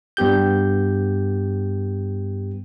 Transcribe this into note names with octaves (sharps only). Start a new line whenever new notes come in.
G2 B3 G4 G6